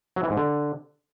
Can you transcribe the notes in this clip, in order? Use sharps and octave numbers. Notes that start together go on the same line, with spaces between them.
F#3
E3
G#2
D3